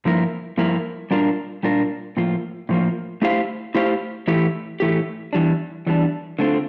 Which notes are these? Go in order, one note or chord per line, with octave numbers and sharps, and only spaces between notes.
G2 F3 A#3 E4 A#4
G2 F3 A#3 E4 A#4
A#2 G3 D4 F4 A#4
A#2 G3 D4 F4 A#4
A2 F3 A#3 F4
A2 F3 A#3 F4
A3 E4 G4 C5 F5
A3 E4 G4 C5 F5
A2 E3 A3 E4 G4
A2 E3 A3 E4 G4
E2 E3 G3 D4
E2 E3 G3 D4
D3 A3 C4 F4